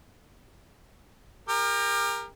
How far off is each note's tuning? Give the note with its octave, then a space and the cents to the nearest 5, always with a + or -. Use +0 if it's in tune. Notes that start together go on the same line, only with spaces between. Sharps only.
G4 +35 A#4 +0